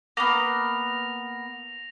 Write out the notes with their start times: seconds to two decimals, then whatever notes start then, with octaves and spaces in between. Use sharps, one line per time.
0.17 A#3 B3 A#6 F7